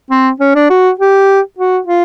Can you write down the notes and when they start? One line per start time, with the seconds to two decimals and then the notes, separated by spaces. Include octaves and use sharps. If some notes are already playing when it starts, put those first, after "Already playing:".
0.10 C4
0.40 C#4
0.55 D4
0.70 F#4
0.99 G4
1.58 F#4
1.87 F4